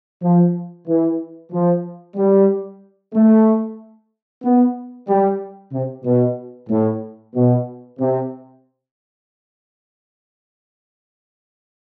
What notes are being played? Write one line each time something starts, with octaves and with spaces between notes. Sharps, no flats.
F3
E3
F3
G3
A3
B3
G3
C3
B2
A2
B2
C3